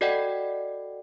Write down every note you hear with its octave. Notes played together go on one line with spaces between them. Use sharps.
F#4 A4 D5 D#5 F#5 G5